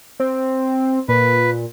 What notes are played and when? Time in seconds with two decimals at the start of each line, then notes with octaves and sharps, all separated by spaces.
0.20 C4
1.08 A#2 B4